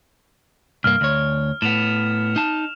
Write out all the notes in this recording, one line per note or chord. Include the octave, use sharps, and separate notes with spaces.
C2 G2 A#3 F6
D2 C#5
A2 B3 E7 F7
D#4 A5